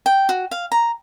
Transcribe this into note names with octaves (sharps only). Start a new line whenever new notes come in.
G5
F#4
F5
A#5